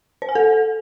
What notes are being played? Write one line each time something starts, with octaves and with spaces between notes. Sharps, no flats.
C5
G#5
A4